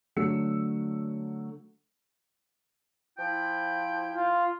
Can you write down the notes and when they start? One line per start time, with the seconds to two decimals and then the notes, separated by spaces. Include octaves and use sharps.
0.16 D3 F#3 A3 E6 C#7
3.18 F3 E4 G5
4.15 F4